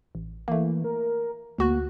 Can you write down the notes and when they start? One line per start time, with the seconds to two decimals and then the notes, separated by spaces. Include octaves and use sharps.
0.15 A1
0.48 E3 A3 A#3
0.84 A#4
1.58 D2 A#3 F#4 F#6